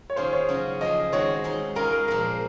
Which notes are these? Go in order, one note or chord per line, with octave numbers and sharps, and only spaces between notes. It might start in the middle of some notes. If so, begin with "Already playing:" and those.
C#5
D#3 A#3 C#4 F4 G#4 C5
C#5
C#3 F#3 C#4
F3 A#3 F4 G#4 D#5
D#3 G#3 C4 F#4 C#5
G#3 D#4 G#4
G#3 C#4 F4 G#4 A#4
A#4
A#2 F3 G#3 A#4